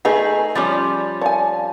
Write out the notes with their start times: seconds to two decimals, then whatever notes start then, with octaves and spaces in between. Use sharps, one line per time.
0.05 A3 D#4 G#4 B4 G5
0.55 F3 G3 C#4 A6
1.21 C#5 D5 F5 G#5 A5